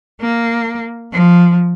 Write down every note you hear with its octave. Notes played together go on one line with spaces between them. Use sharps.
A#3
F3